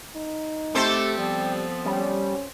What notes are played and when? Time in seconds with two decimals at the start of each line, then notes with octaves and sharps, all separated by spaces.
0.16 D#4
0.75 A3 C4 G4 A4 C5
1.18 F3 G3 B3
1.85 G3 C#4